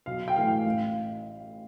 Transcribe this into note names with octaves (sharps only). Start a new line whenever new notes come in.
B1 F5
G5
A2 E3 A3 F5
A1 F5